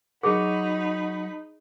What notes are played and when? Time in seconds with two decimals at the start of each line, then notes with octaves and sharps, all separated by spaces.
0.23 F#3 D#4 F#4 G#4 B5